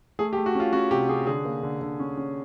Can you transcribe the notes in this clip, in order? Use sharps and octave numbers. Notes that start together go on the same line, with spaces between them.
A3 G#4
G4
A3
F#4
C#4 F4
C#4 F#4
C3 G4
C#4 G#4
D3 G#4
A#3
D3
D3
C#4
C#4